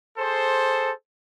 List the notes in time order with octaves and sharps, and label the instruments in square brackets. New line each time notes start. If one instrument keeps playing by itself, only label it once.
[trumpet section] G#4 A4 C5